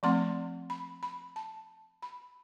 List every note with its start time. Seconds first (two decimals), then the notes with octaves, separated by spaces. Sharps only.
0.03 F3 A3 C4 C6
0.70 B5
1.03 B5
1.36 A5
2.02 B5